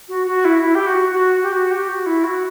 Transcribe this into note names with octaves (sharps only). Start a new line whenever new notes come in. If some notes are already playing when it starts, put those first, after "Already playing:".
F#4
F#4
E4
E4
G4
F#4
F#4
G4
F#4
G4
F#4
E4
F#4